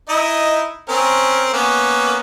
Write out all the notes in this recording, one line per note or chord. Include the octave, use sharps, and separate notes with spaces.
D#4 E4 D#5
C4 C#4 A#4
A#3 B3 C#4